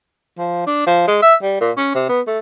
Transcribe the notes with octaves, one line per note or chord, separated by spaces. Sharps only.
F3
D4
F3
G#3
E5
G3
A#2
C#4
C3
B3
A3